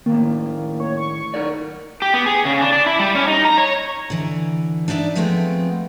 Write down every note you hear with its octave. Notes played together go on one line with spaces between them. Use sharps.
A2 D#3 A#3
C#5
C#6
D#4 A#4 D5
G4
B3
G#4
C#3
D4
D4
E4
G3
C#4
D#4
A#5
C#5
D3 E3
D4 D#4 D5 E5 A5
F3 G#3 A3 B3 C4